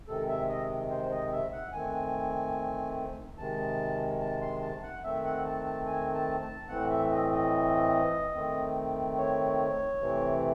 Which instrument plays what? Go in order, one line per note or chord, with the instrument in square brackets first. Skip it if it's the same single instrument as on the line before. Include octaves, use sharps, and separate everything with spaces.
[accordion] C3 D#3 G#3 A4
E5
D#5
C5
D#5
E5
F#5
D#3 A3 C4 G#5
C3 D#3 G#3 A5
A5
C6
A5
F#5
D#3 A3 C4 E5
F#5
A5
A5
G#5
A5
A5
A2 E3 A3 C4 F#5
E5
D#5
D#5
D#3 A3 C4
C#5
C3 E3 A3 C4